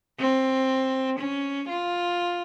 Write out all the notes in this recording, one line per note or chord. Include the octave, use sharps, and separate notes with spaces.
C4
C#4
F4